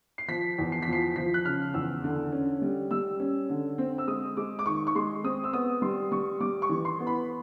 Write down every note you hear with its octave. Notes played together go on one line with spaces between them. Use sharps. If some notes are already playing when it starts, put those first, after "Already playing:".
C7
F3 B6
E2
C7
B6
F3 C7
F3 B6
F#6
C#3 F6
E2 E6
D3
C#4
G3
G3 E6
C#4
D3
C4
E6
G#3 D#6
G#3 D6
D6
D#3 C#6
C#6
G#3 C6
C4 D#6
E6
B3 D#6
G3 C6
G3 C#6
G3 D6
C#6
E3
C6
B3
B5